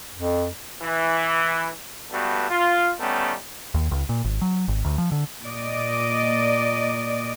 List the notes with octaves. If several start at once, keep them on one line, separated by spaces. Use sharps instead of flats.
F2
E3
G2 G3 A3 B3 F#4
F4
D#3 G3 A3 B3 C#4
D#2
C#2
A#2
G#1
F#3
G#1
D2
F3
D3
A#2 D5 D#5